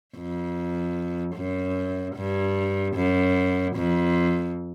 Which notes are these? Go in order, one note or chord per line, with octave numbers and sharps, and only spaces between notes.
F2
F#2
G2
F#2
F2